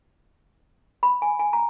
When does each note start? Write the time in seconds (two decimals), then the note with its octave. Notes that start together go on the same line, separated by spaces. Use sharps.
1.03 B5
1.22 G#5
1.39 G#5
1.53 A#5